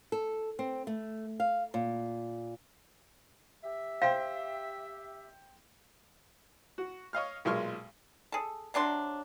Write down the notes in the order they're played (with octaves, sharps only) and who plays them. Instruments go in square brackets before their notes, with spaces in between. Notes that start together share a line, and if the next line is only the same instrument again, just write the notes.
[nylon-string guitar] A4
C4
A3
F5
A#2
[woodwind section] G4 E5
[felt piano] C5 G5 [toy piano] F5
[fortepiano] F#4
C#5 D#5 F5 F6
B1 A#2 G#3 C6 C#6 F6
[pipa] G#4 A4
C3 F#3 D4 C6